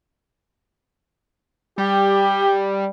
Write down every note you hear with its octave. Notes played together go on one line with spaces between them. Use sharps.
G3 G4